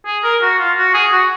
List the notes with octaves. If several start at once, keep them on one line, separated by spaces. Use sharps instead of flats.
G#4
A#4
F#4
F4
F#4
G#4
F#4